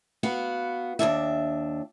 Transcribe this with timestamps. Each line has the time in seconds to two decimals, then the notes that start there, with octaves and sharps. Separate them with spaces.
0.23 B3 F#4 F5
0.99 D#2 G#2 D4 E5